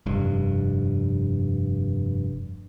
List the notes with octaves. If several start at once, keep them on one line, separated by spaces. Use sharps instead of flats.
F1 G2